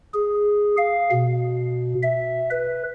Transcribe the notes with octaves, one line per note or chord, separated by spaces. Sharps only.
G#4
F5
B2
E5
B4